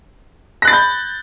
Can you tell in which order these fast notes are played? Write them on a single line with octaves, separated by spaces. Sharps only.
A#6 F#6 A6 B5 G6